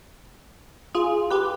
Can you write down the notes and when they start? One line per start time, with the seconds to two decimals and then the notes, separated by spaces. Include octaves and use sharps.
0.95 F4 G#4
1.30 G4 B4